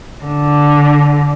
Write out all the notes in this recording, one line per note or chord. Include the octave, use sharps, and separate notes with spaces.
D3